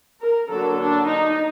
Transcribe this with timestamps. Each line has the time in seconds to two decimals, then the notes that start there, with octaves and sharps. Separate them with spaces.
0.21 A#4
0.49 D3 F#3 A#3 D4 A4
0.79 D4
1.07 D#4